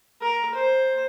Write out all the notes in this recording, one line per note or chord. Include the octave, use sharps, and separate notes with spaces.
A#4
C5